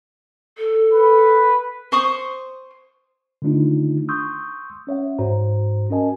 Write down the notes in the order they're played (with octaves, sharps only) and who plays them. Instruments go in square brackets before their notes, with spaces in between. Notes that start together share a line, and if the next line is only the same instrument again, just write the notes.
[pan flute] A4
[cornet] B4
[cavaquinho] C5 C#6 D#6
[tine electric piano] D3 D#3 A3 D4 D#4 F4
C6 C#6 D#6 E6 G6
C#4 C#5 E5 F#5
G#2 F#4 C5 A#5
C#4 F#4 A#4 D#5 G#5 A5